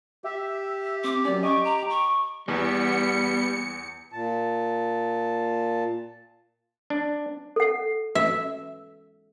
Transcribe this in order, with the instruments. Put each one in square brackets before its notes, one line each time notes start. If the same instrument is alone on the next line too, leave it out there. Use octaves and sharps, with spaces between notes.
[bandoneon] G4 [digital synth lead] E5
[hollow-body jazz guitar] C4 [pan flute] D6
[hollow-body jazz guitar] F#3 C#4 [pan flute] D5
[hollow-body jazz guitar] D#5 G#5 [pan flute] C#6 [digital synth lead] D6
[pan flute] A#5
C#6
[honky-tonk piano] E2 [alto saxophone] G3 [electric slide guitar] B3 [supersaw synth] C#7
[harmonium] A#2 A5
[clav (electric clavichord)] D4
[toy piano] A4 F#5
[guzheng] E5